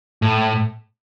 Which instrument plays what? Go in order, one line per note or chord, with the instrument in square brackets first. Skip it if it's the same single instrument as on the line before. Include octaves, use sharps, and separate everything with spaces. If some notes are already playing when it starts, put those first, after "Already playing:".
[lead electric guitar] A2